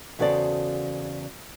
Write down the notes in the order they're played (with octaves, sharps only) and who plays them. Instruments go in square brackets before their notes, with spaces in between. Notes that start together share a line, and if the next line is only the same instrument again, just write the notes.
[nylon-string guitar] E2 C#3 F#4 A4 C5 D5